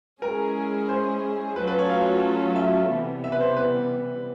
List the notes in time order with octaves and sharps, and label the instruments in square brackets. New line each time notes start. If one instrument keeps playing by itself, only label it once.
[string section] G#3 C#4 E4 G#4 [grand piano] A#4
[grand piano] C5
[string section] F#3 A3 C#4 F4 A4 [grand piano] B4
[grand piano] B4
C#5
F5
E5
[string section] C3 E3 G3 B3
[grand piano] E5
B4
C5
B4